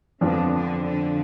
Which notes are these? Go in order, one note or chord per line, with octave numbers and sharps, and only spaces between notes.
F2 D3 F3 B3 D4 F4
D3
D3